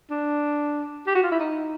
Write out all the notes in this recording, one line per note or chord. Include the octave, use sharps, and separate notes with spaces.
D4
G4
F#4
F4
E4
D#4